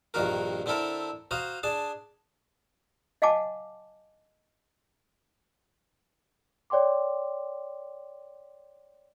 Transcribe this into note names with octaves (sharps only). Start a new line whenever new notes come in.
A#1 G2 D#3 A#3 F#4 A#4
D3 C4 E4 A4 A#4
F#4 C5 F5 A#5 D#6
D4 G#4 A5
D#5 F5 F#5 G#5 A5 D6
C#5 D5 G5 C6 D6